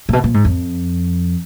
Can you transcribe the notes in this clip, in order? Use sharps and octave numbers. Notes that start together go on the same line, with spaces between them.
A#2
B2
A#2
G#2
F2